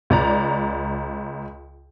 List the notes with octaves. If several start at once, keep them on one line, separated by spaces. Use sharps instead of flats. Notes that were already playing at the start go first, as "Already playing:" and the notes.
C#2 D5 A#5